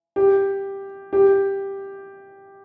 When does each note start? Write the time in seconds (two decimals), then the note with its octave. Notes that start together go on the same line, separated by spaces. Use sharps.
0.16 G4
1.13 G4